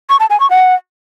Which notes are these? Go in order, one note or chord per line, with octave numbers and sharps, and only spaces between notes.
C#6
A5
G#5
C#6
F#5